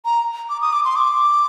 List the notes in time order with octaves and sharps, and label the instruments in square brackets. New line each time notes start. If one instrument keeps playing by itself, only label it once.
[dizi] A#5
D6
D#6
D6
C6
D6